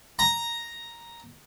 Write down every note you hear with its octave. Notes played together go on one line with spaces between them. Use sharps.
A#5